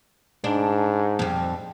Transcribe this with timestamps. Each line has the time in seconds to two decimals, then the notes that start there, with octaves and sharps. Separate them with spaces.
0.44 G#2 D4
1.19 F2 G3